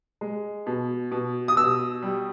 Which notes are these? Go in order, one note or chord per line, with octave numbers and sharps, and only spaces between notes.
G#3
B2
B2
D#6
B2 E6
G3